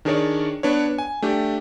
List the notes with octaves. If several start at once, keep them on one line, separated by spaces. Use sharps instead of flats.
D#3 D4 G#4 A#4 C#5 D5
B3 D4 B4 C#5
G#5
A3 D4 G4